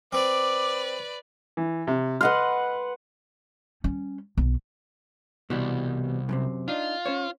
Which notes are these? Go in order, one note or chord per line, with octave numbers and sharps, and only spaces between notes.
C4 B4 D5 D6
E3
C3
B4 D#5 F#5 C6 F6
G3 C#4
B1
C2 B2 E3 G3
F#2 A2 C3
D4 D#4 F4
C#4 C5 C#5